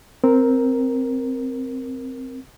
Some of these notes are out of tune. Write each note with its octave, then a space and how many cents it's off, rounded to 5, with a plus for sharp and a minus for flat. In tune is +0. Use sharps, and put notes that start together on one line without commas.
C4 +0 A#4 +0